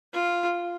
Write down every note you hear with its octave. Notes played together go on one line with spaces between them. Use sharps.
F4